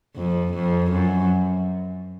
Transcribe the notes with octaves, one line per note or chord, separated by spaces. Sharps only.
F2
F2
F#2